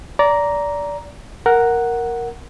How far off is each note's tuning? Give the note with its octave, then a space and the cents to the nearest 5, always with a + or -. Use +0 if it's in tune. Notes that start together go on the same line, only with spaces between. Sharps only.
D5 -20 A#5 +5
A#4 +0 F#5 +0